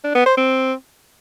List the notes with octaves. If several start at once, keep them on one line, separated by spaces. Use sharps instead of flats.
D4
B3
C5
C4